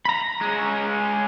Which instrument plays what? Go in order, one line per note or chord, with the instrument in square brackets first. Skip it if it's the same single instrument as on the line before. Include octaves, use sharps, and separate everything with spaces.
[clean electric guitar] A#5 B5
[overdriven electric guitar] G#3 C#4